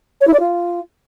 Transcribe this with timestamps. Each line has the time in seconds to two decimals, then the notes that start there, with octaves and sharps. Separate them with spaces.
0.21 C#5
0.27 E4
0.33 D5
0.39 F4